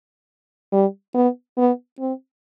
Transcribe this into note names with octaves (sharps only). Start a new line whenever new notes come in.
G3
B3
B3
C4